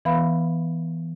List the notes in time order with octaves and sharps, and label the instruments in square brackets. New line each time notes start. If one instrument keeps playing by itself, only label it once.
[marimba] E3 B3 B4 F5 B5